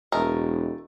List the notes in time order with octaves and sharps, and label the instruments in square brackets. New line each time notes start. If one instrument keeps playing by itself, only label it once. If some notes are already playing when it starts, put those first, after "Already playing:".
[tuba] E1 [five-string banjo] A3 A#4 D#5